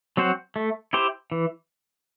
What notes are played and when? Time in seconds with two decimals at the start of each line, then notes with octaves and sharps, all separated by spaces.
0.17 F#3 C4 F#4 C5
0.56 A3
0.93 E4 G4 C5
1.32 E3